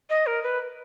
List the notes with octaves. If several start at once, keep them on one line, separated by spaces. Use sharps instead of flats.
D#5
A#4
B4